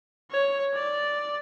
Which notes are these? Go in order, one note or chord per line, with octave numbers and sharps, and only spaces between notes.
C#5
D5